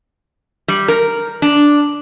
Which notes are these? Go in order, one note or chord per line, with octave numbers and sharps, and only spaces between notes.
G3
A#4
D4